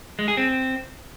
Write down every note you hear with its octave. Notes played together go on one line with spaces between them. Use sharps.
G#3
G#4
C4